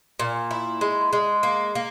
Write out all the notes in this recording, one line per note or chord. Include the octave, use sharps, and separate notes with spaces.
A#2
E4
G#3
G#3
A#3
A#3